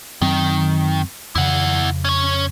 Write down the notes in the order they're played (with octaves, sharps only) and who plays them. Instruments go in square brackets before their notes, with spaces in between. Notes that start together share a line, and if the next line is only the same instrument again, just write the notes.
[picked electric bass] F#2 F#3 C4 [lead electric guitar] D#3
[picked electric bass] F2 C#3 [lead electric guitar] E4 F#5
[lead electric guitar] C#4 C#5